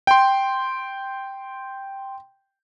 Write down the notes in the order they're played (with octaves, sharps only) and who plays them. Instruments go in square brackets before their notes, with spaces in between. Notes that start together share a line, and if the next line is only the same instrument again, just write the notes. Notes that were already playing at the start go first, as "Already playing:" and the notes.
[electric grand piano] G5 C6